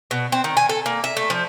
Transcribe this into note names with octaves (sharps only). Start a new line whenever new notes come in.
B2
C4
D#3
G#5
A4
A#3
E5
A3
F3